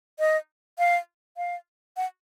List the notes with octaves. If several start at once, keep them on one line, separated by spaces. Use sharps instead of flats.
D#5
F5
F5
F#5